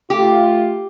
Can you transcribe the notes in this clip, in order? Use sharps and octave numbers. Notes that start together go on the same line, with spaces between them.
A3 F4 G4